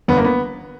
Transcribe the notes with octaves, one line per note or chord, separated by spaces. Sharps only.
G1 B3
A#3
B3